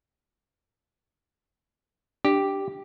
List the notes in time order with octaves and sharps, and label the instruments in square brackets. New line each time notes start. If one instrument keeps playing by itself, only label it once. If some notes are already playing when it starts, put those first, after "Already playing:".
[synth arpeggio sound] D4 [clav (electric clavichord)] G4